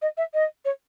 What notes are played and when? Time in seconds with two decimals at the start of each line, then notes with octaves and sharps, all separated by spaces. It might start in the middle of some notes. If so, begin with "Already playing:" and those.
0.02 D#5
0.17 E5
0.34 D#5
0.65 C#5